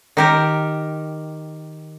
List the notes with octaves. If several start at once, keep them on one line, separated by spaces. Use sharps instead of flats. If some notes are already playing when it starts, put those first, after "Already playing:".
D#3 G4 A#4